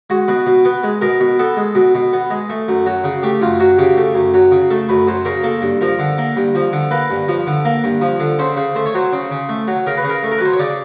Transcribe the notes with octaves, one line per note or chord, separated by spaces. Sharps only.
G#3 F#4
B2 B4
B2
B3 B4
G#3
B2 A#4
B2
B3 A4
G#3
B2
B2
B3
G#3
A3
F#2
F#3
C#3
A3 G4
F#2 F4
F#3 F#4
C#3 G4
A3
F#2
F#3
C#3
A3 A4
F#2 B4
F#3 C5
C#3 A#4
A#3 A4
G2
F3 A#4
D3
A#3
G2
F3
D3
A#3 B4
G2
F3
D3
A#3
G2
F3
D3
C#3 C5
C#3
A3 C5
C#5
F#3 C5
C#3
C#3
A3
F#3
C#3 A#4
B4
C#3
A#4
A3
A#4
B4
F#3 C5
C#5
C#3 D5